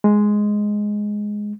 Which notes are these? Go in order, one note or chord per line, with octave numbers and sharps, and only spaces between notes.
G#3